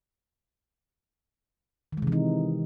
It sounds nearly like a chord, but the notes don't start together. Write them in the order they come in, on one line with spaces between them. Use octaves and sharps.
D#3 G#3 C3 E3 D#4